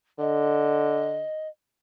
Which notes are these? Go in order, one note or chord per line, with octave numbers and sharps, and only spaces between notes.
D3 D#5